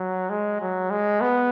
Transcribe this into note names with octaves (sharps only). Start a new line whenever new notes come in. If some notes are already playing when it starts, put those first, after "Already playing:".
Already playing: F#3
G#3
F#3
G#3
B3